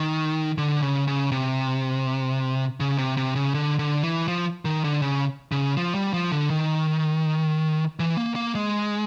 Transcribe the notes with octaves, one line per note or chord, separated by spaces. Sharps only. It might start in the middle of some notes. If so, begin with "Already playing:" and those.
Already playing: D#3
D3
C#3
C#3
C3
C#3
C3
C3
C#3
D3
D3
E3
F3
D#3
D3
C#3
C#3
F3
G3
F3
D3
D#3
E3
A#3
A#3
G#3